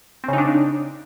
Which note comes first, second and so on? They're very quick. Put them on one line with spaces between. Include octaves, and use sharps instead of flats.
C4 C#3 D#4 D4